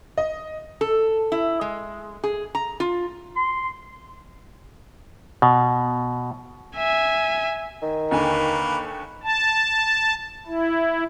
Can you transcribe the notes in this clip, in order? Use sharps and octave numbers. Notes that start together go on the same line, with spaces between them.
D#5
A4
E4
G#3
G#4
A#5
F4
C6
B2
E5 G#5
D#3
D#2 D3 A#3 B4 G#5
A5
E4